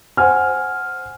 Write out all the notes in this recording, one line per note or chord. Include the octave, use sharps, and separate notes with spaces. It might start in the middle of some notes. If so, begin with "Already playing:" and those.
C5 F#5 G#5 F6